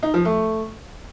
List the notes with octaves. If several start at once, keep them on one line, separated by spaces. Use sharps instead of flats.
D#4
F3
A3